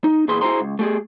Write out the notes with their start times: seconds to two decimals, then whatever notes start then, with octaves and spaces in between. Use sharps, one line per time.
0.04 D#4
0.28 A#2 E3 G#4 B4 C6
0.41 E4 F#4 G#4 C5 A#5 C6
0.61 C#2
0.79 A3 G4 G#4